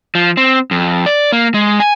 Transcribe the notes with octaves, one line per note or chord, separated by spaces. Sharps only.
F3
C4
F2
D5
A#3
G#3
G#5